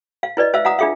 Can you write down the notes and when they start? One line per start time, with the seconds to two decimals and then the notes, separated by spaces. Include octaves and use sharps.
0.23 F5
0.37 E4 B4 D5 D#5
0.54 C5 E5 F5 E6
0.65 F5 F#5 A#5 D#6
0.79 D4 F4 G#4 E5 F5